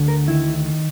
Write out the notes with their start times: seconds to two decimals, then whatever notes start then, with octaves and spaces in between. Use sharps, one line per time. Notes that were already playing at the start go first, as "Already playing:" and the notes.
Already playing: D2 D3
0.08 A#4
0.28 D#3 E4